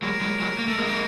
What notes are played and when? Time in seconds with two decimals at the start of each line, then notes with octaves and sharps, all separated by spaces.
0.02 F#3 G#3 A#4
0.21 F#3 G#3
0.40 F#3 G#3
0.59 A#3
0.68 A3
0.78 G#3 A#3